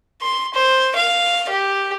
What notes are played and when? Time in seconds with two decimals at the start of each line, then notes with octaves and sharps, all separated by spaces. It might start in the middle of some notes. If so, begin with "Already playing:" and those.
0.22 C6
0.54 C5
0.96 F5
1.49 G4